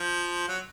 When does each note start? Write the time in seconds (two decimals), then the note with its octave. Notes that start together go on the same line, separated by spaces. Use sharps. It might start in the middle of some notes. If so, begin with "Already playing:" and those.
Already playing: F3
0.48 F#3